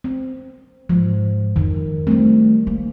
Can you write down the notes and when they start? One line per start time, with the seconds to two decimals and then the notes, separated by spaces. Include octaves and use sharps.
0.04 C4
0.89 G#2 F3
1.56 F2 D#3
2.07 G3 A3 C4
2.67 A#3